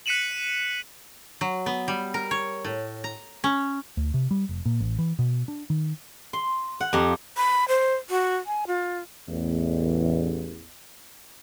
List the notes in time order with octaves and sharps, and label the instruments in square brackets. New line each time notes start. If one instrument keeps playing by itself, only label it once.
[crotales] F#6 B6 C#7 D#7 E7 F#7
[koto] F#3
B3
G3
A#4
C#5
A2
A#5
C#4
[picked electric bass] D2
C3
G3
F1
A#2
A1
E3
B2
D4
D#3
[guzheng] C6
F#5
F2 G4 A#5
[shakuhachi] B5
C5
F#4
G#5
F4
[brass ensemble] A1 E2